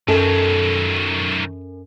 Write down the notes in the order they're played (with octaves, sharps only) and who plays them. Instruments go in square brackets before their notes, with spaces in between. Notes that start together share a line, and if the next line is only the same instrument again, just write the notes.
[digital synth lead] F#2 [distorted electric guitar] D#3 F#3 [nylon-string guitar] A4